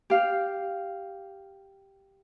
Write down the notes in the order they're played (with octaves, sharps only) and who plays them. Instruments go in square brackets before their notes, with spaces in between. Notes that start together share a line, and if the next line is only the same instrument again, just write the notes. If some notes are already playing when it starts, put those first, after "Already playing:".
[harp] G4 F5